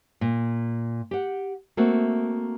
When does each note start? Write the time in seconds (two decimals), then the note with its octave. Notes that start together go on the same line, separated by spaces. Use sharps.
0.21 A#2
1.11 G4 F#5
1.77 A3 A#3 C4 F#4